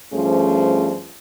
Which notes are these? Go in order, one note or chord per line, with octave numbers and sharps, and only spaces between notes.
G2 F3 A3 C#4 G#4 C5